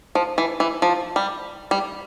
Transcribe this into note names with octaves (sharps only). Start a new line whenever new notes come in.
F3
E3
E3
F3
G3
G3